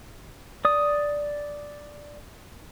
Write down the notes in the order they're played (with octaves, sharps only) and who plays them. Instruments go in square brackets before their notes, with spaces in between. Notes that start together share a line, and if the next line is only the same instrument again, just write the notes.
[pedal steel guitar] D5 D#6